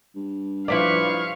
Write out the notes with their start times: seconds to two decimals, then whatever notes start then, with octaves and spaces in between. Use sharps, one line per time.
0.15 G2
0.68 F3 E4 B4 D5 F5 C#6